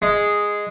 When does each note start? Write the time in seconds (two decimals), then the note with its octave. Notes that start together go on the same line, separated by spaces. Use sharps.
0.02 G#3